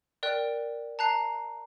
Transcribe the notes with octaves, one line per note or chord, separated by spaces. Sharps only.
A#4 D5 G5 F#6
A5 A#5 F#6 C7